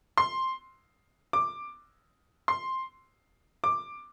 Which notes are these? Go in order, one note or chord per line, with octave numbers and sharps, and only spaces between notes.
C6
D6
C6
D6